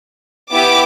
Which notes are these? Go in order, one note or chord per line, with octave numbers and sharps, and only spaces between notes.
B3 E4 G4 D6